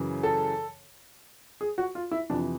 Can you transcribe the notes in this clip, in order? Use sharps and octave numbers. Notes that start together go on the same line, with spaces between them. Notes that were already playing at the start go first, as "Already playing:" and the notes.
Already playing: F#2 C#3 E3
A4
G#4
F#4
F4
E4
F2 C3 E3 D4